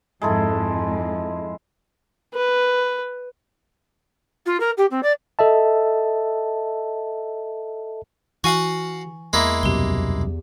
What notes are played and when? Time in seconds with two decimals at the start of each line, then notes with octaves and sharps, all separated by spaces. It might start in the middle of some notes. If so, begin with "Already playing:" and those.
0.22 F2 G#2 G#3 E4 A4
2.34 B4
4.46 F4
4.60 A#4
4.77 G4
4.90 C4
5.03 D5
5.39 A4 D#5 E5 A5
8.44 E3 F#4 F5 F#5 G#5 C#6
9.33 E2 G#3 A#3 E4
9.63 C2 F#2 B2 G4 G7